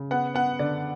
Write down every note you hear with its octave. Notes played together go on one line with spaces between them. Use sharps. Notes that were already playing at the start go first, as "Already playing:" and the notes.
Already playing: C#3
B3 F#5
B3 F#5
D3 D5